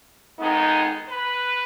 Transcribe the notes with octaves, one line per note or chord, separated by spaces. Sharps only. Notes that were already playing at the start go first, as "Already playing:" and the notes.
F2 D#3 G#3 B3 D#4
B4